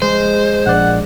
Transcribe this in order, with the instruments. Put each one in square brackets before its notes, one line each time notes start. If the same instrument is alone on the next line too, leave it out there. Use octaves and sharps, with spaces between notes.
[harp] G#3 [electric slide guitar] C5
[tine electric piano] A#1 D5 [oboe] F#5